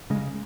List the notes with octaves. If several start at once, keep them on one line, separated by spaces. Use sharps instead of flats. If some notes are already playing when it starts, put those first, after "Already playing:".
C#3 G#3